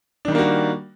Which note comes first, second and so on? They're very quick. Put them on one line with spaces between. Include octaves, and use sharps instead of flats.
D4 D#3 G3 A#3 F#4